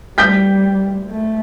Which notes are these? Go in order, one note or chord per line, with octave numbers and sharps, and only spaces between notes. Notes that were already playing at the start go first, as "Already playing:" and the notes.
G3 G6 B6
A3